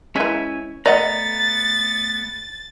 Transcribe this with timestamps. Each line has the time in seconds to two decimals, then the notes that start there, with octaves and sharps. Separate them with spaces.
0.16 E3 G#3 C#4 E5 G#5
0.86 A3 B3 D5 D#5 F#5 A#5 A6